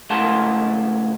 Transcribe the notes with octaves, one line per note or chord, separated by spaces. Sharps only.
C#2 A2 F#5 A5 C6